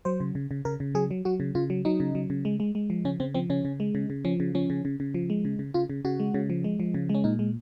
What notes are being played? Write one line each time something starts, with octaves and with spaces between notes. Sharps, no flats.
F#3 C5
C#3
C#3
C#3
C#3 A#4
C#3
F#3 G#4
F#3
F#3 F#4
C#3
C#3 F4
F#3
F#3 D#4
C#3
F#3
C#3
G#3
G#3
G#3
F3
C#3 C#4
C#3 C4
F3 C4
C#3 C#4
C#3
G#3
C#3
C#3
F3 C#4
C#3
F3 C#4
C#3
C#3
C#3
F3
G#3
C#3
C#3
C#3 F4
C#3
C#3 F#4
G#3
C#3
F3
G#3
F3
C#3
G#3
C#4
A#2 D#4
G#3